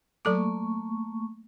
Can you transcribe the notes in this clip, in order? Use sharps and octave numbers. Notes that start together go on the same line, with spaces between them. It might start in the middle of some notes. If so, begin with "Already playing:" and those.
F#3 A3 A#3 A4 C#6 D6